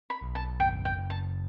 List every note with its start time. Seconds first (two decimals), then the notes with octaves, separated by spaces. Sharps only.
0.10 B5
0.22 B1
0.35 A5
0.60 F#1 G5
0.85 G5
0.97 F#1
1.10 A5